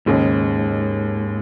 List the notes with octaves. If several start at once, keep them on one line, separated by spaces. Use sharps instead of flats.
D#2 G#2 C#3 G#3 C#4 G#4